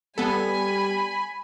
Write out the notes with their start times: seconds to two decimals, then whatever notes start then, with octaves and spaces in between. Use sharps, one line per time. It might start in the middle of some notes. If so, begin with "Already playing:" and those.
0.18 G3 B3 A4 G#5 B5